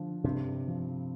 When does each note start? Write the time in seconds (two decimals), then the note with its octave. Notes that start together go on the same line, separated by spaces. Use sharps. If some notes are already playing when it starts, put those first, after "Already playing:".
Already playing: D3 F3
0.24 G2 C3
0.68 F3